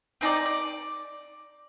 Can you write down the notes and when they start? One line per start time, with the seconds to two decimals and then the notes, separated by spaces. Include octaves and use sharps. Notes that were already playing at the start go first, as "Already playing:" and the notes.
0.21 C4 D#4 A4 D5
0.46 D5